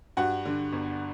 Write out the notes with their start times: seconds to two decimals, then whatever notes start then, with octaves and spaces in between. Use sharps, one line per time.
0.17 G2 F#4 F#5
0.45 D3
0.73 G1